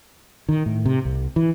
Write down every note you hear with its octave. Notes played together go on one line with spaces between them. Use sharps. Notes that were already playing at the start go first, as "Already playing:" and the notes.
D#3
A2
C3
C2
E3